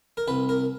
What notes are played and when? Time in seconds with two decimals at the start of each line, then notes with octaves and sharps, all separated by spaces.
0.17 A#4
0.28 C2 B4
0.49 A#4